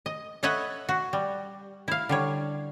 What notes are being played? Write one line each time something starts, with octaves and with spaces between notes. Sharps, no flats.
D#5
A4 B4 C#5 D#5 E5 F#5
F#4
G3
E4 F5
D3 G3 C#5